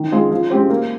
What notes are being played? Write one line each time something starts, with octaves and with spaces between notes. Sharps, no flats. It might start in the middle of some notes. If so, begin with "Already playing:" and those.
Already playing: D#3
G#3 C4 F4
F3
G#3 C4 G4 C5
A#3